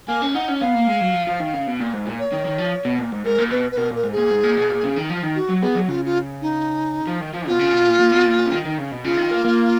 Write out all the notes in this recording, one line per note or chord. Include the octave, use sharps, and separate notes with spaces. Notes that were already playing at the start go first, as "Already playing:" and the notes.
A#3 G#5
C#4
D#4 F#5
C#4
B3 F5
A#3
G#3
F#3
F3
F3
D#3
C#3
B2
A#2
G#2
A#2
C#5
D#3
D#3
F3
B2
A#2
G#2
G#2 A#4
A#2
B2 B4
B4
B2 A#4
A#2 A#4
G#2
A#2 G#4
G#2
A#2
B2
A#2
C#3
D#3
F3
D#3
F#4
F#3
B3 G#4
F#3
C#3 F4
F4
D#4
F3
D#3
F3
B2 F4
C#3
B2
A#2
A#2
B2
A#2
A#2
C#3
D#3
D#3
C#3
B2
C#3 F4
D#3
A#3
A#3